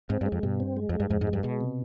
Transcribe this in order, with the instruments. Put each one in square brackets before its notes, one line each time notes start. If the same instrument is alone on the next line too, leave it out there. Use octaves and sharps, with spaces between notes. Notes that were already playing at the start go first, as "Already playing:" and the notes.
[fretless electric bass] G#2 [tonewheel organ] C4
[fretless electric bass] G2
[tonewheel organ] G#3
[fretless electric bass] F2
[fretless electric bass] G2 [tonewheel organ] B2
[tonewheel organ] C4
G#3
[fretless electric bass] F2 [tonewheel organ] G#3
[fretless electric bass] G2
[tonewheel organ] F2 [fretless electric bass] G#2
[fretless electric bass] G#2
[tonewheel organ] G#3
[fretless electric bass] G2
[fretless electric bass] B2 [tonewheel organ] G#3
[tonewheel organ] C3